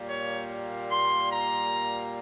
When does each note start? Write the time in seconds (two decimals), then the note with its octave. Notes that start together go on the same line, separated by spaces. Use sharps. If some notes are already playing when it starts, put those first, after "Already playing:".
Already playing: A#2 G3 A#3
0.09 C#5
0.92 C6
1.32 A#5